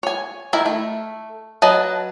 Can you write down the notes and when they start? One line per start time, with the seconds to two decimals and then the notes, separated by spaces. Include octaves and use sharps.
0.03 C#5 G#5
0.53 D#3 E4 E5
0.66 A3
1.62 F#3 B4 D#5 F#5 A5